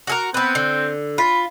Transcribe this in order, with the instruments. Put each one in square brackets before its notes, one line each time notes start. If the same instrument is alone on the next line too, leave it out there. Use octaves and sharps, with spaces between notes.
[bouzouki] F#4 G#4 A#4
[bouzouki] B3 B4 [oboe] C4
[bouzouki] D3
[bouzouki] F4 [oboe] B5